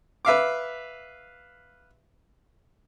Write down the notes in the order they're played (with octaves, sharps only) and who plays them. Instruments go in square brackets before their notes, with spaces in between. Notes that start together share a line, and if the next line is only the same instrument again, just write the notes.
[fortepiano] B4 E5 F5 D6